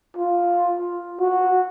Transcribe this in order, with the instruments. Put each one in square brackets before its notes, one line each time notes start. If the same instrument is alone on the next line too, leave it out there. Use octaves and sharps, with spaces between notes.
[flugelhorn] F4
F#4